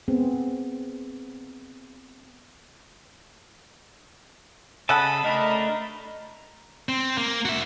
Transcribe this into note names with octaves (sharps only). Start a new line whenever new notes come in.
B3 C4 G#4
C#3 C#4 A4 D#5 F#5 A5 B5
A3 D4 A#4 D#5
C4
A#3
F#4 E5